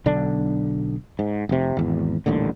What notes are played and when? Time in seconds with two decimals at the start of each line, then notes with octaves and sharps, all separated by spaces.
0.06 B1 D3 D4
1.19 G#2
1.49 F1 C3
1.77 G#1 E2
2.26 D#1 A1 D#2 D3